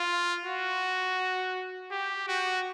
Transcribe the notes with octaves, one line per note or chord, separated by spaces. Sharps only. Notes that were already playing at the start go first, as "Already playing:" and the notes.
Already playing: F4
F#4
G4
F#4